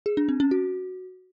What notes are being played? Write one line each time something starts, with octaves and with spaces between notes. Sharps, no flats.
G#4
D4
C4
C#4
F#4